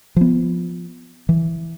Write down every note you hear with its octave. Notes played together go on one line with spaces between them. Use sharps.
F3 B3
E3